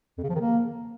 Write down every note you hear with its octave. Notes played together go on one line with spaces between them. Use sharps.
F2
C#3
F3
D#3
A#3